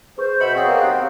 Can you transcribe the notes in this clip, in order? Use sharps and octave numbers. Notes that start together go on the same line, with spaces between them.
G#4 B4 C5 C#6
B2 E5 B5 C#7
B3 C4 G#4 C#5 F5 C#6
A#3
D#2 G4 F#6 C7